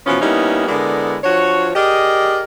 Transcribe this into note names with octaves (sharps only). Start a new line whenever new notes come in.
B2 E3 F3 B3 C#4
G3 A#3 B3 C#4 D#4 E4
D3 G#3 B3 E4 A#4 D5
F3 D4 F#4 C#5
G4 G#4 A#4 D5 D#5